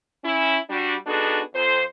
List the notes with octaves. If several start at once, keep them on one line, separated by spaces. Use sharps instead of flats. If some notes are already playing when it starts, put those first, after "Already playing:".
C#4 E4
G3 D4 F#4
B3 D4 D#4 F#4 G#4 A4
F2 C5